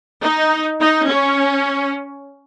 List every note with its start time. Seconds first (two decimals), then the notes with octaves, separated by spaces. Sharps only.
0.22 D#4
0.80 D#4
1.07 C#4